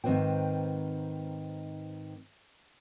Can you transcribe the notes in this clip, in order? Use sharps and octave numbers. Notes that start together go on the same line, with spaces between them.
G#2 D#3 C4 B4 C5 G5